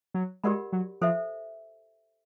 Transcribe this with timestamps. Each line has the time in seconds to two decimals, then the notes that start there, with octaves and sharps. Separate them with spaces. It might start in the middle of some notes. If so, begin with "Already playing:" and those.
0.14 F#3
0.44 G#3 G4 A#4 D5 F#5 B5
0.73 F#3
1.01 F3 A4 C5 E5